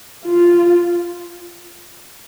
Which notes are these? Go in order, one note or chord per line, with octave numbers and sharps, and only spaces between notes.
F4